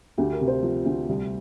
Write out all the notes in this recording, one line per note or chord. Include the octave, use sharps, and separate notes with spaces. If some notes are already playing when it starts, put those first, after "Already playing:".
D2 G4
A#4
C3
C5
F3
D2
C2